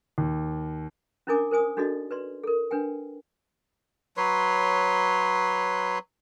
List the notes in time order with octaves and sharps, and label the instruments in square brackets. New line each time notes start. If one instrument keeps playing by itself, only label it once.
[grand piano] D#2
[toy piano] C#4 D4 E4 A#4 G#5 D6
A#4 C5 G#5 D#6
D4 D#4 F#4 A4 D5 D#5
B4 D5 C6
A4 A#4
D4 B4 G5 G#5
[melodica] F#3 B4 C#5 C6